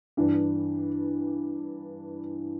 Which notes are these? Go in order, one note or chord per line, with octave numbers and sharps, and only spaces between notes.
G2 E3 D4